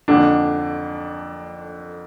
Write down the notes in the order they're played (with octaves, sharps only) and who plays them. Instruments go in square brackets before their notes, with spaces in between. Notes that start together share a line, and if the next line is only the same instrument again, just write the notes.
[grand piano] F2 D3 A#3 D4